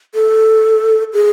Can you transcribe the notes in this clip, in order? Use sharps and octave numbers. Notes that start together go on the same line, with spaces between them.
A4
G#4